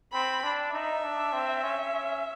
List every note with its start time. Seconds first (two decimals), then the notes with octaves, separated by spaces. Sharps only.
0.13 C4 B5
0.44 D4
0.73 D#4 E5
1.04 D4
1.33 C4
1.63 C#4
1.93 C#4